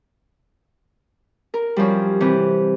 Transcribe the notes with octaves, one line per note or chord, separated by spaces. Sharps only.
A#4
F#2 F3 G3
C3 E3